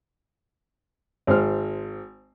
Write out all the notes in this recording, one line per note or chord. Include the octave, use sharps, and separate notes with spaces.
G#1 C5 F6